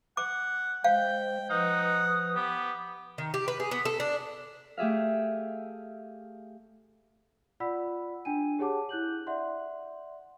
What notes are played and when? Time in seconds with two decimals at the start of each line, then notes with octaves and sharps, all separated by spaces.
0.17 F#5 D6
0.84 G#3 C5 F5 G5
1.50 F3 D#4 B4 F#5 D#6
2.35 B3 G4
3.18 D#3
3.34 G4
3.48 B4
3.60 G#4
3.71 B3
3.85 A4
4.00 D4
4.77 A3 G4 G#4 E5 F5
7.60 F4 D5 F#5 B5 E6 B6
8.25 D4 G5 G#5 D#7
8.59 G4 G#4 C#5 F#5 A5 D6
8.89 E4 F#6 G6 F#7
9.27 D5 E5 F#5 C6